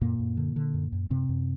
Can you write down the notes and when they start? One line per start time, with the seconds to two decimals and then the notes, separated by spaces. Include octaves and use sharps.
0.01 F#2 A#2 A#3
0.19 F#2
0.37 D3
0.56 D3
0.74 F#2
0.92 F#2
1.10 F#2 C3 C4
1.29 F#2